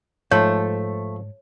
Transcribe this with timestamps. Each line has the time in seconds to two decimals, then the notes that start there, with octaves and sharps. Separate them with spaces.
0.32 G#2 F3 A3 A4 C5 C#5